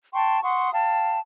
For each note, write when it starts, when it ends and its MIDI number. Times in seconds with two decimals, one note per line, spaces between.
0.13 0.40 79
0.13 0.40 81
0.13 0.40 84
0.13 0.40 85
0.43 0.70 78
0.43 0.70 84
0.43 0.70 85
0.43 0.70 87
0.73 1.19 77
0.73 1.19 79
0.73 1.19 81